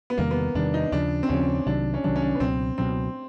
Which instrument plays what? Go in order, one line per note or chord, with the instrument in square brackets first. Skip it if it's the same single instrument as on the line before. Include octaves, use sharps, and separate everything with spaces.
[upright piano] B3
[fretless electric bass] E2 C3 D#3 G3 [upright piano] A#3
[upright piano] B3
[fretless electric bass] E2 C3 D#3 G3 [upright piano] D4
[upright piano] D#4
[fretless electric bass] D#2 C#3 F3 [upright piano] D4
[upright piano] C4
[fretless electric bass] D#2 C#3 F3 [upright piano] C#4
[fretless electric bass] C2 C3 D#3 F#3 [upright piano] D4
[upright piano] C#4
[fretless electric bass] C2 C3 D#3 F#3 [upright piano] D4
[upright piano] C#4
D4
B3
[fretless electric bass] C#2 B2 F#3 [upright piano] C4
[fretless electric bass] C#2 B2 F#3 [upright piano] C4